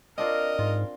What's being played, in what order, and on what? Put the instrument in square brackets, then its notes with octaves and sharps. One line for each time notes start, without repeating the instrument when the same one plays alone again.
[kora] C4 D4 F4 [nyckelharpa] A#4 [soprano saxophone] D#5
[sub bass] G#2 [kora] F4